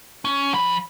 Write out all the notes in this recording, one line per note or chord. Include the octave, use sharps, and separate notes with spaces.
C#4
F3 B5